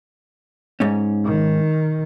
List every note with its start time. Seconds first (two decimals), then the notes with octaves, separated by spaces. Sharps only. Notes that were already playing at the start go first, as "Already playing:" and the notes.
0.80 G#2 C#4
1.25 D#3